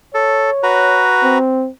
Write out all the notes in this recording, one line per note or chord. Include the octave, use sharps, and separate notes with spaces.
A4 C#5
F#4 B4 A#5
C4